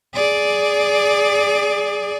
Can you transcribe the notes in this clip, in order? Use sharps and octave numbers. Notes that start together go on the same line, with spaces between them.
G#4 D5